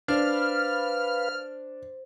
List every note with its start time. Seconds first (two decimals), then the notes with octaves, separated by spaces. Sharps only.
0.08 D4 B4 C5 F5 F6